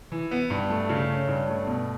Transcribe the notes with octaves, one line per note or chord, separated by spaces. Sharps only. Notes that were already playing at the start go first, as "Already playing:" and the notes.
E3
B3
G2
A3
C#3
C#4
G2
A3
B2